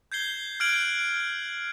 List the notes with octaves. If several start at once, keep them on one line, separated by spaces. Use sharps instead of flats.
G6 G#6 C7 G7
F6 F#6 G#6 D7 F#7 G7